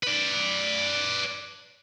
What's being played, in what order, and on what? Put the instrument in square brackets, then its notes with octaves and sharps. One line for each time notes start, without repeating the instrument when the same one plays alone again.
[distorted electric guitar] B4 D5